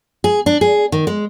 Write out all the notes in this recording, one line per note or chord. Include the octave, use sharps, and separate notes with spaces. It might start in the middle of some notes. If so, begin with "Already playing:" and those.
G#4
D4
G#4
D#3
G#3